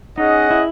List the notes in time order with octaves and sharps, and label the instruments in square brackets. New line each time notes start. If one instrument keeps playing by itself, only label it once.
[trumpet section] C#4 G#4 D#5 F#5 [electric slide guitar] D#4
[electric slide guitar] E4